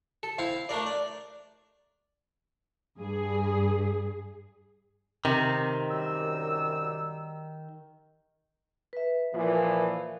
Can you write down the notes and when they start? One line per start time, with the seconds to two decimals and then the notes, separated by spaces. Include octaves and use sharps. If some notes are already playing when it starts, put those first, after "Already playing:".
0.23 A4
0.39 C4 E4 F5
0.69 A3 D4 A#4 D5
0.86 D5
2.98 G2 G#4
5.25 C3 D#3
5.90 F#2 G3 E6
8.93 B4 E5
9.34 A#2 E3 F3